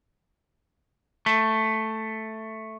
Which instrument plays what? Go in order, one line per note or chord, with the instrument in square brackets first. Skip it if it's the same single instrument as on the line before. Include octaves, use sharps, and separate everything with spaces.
[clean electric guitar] A3